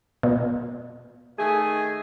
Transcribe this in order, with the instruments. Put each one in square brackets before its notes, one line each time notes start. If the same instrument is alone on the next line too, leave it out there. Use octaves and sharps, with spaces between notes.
[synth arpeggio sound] B2
[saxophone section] D#3 A3 G#4